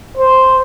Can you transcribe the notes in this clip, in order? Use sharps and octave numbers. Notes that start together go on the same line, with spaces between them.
C5